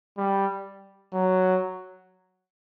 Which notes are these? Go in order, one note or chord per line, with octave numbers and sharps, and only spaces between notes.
G3
F#3